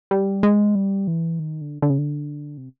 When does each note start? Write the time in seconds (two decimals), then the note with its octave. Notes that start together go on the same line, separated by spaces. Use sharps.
0.11 G3
0.43 G#3
0.75 G3
1.08 E3
1.40 D#3
1.61 D3
1.82 D3
1.90 C#3
1.98 D3
2.58 C3